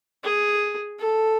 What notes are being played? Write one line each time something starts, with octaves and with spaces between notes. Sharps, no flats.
G#4
A4